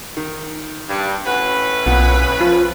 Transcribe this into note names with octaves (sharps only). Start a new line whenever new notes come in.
D#3
G2
A2 C#4 F#4 B4
B1 A#2 B3
F3 F4 B5